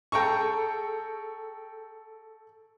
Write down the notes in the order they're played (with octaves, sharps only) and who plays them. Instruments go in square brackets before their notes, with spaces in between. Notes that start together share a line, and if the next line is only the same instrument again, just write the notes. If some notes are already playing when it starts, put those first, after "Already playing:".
[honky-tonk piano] G#4 A4 [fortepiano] G5 A#5 C#6